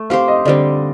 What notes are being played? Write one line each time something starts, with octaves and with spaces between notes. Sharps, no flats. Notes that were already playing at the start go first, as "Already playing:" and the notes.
Already playing: A3
C4 G4 C5 F5
D#5
D3 G3 C4 D5